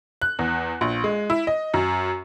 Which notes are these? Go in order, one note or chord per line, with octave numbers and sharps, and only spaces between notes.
F#6
E2
A#1
G#3
E4
D#5
F#2